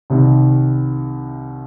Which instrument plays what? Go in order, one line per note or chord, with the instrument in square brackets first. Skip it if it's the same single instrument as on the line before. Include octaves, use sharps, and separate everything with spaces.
[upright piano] C2 C3 D#3